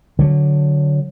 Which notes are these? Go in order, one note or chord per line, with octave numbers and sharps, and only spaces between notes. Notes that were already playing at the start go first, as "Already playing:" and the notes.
D3 F#3